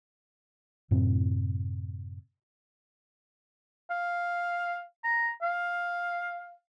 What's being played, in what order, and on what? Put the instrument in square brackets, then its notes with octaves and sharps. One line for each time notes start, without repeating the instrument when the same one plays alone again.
[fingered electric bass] F#2 A2 C3 C4
[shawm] F5
A#5
F5